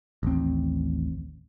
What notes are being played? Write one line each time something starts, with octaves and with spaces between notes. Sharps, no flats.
A1 D#2 C4